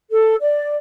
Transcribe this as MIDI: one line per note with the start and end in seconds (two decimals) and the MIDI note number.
0.12 0.35 69
0.42 0.76 74